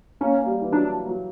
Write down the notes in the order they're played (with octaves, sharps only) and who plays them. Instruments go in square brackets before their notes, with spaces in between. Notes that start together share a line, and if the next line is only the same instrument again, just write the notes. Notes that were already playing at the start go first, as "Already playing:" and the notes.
[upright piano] A#3 [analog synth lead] C#4
[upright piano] A#3
G3
E3
[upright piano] F#3 [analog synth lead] D4
[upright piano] F#3